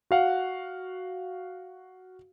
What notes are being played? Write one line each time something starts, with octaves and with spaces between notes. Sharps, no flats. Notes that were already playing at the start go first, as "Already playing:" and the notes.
F#4 F5 F#5